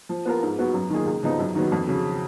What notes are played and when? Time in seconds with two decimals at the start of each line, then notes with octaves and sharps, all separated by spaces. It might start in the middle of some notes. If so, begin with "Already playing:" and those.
0.09 F3
0.25 B3 F4 A#4
0.43 G#2
0.59 F#3 B3 F#4
0.74 F#2
0.90 D#3 A#3 F4 G#4
1.06 C#2
1.23 C#3 F3 B3 D#4
1.39 F#2
1.55 D#3 F#3 B3
1.72 F2
1.87 C#3 F#3